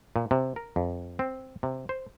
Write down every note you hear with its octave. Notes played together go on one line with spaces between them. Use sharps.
A#2
C3
A#4
F2
C4
C3
C5